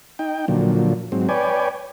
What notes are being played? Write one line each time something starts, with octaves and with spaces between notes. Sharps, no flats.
D#4 G5
A#2 D3 F3 F#3
G#2 F#3 C4
B4 C#5 D5 G5 G#5